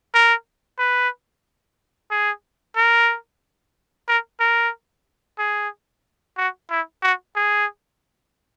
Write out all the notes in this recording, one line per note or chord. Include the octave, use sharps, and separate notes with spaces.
A#4
B4
G#4
A#4
A#4
A#4
G#4
F#4
E4
F#4
G#4